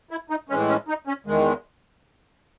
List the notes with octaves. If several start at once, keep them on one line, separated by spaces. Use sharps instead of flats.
E4
D#4
A2 E3 G#3 C#4
C#4
D#4
C#4
E2 D#3 G#3